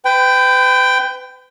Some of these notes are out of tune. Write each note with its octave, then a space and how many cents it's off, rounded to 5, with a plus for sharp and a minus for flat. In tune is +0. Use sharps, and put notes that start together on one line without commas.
B4 +40 G5 +0 B5 +20